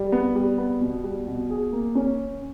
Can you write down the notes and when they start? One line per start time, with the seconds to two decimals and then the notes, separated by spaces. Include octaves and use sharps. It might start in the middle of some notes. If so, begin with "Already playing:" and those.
Already playing: G3
0.12 B3
0.35 G3
0.58 B3
0.81 B2
1.04 G3
1.27 B2
1.50 G#4
1.72 A#3
1.95 C#4